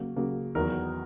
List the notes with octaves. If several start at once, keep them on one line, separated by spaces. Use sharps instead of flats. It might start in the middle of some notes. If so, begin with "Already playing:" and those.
Already playing: C#3 F#3 A#3
C#3 F#3 A#3
E2 D#3 F#3 B3 A#4